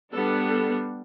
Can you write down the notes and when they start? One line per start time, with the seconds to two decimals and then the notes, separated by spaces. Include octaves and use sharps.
0.12 G3 B3 D4 A4
0.50 A4